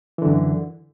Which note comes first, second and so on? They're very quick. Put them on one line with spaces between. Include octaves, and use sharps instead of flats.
E3 D3 F#2